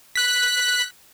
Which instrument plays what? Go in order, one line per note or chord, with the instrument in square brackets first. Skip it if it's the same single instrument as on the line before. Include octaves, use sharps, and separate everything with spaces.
[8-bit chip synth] F#6 B6